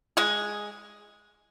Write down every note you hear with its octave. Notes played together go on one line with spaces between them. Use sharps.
G#3 G#4